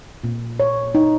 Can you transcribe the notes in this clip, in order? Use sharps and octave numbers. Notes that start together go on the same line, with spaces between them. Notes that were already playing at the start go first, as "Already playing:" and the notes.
A#2
C#5
D#4